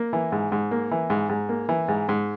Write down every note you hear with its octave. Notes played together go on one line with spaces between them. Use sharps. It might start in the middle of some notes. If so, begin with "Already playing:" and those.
Already playing: A#3
E3
G#2
G#2
A#3
E3
G#2
G#2
A#3
E3
G#2
G#2